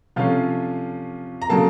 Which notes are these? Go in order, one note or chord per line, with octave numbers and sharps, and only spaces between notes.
C3 F3 A3 C#4 F4 F5
A#5
C#3 F#3 A#3 A4 A5